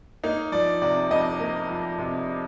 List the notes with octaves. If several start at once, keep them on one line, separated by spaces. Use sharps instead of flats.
A#3 D#4
F3 D5
C3 D5
F2 D#5
A#3
F3
C3